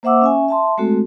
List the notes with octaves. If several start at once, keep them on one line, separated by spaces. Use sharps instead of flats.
A#3 C5 E5 F#5 D6 E6
C#4 E5 G#5
E5 A5 C6
G#3 A3 C4 F#4 A4